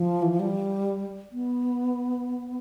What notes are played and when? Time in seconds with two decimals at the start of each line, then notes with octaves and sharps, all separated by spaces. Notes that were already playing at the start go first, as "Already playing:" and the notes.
Already playing: F3
0.22 E3
0.31 F3
0.40 G3
1.32 B3